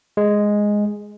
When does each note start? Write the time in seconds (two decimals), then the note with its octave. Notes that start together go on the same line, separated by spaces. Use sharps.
0.17 G#3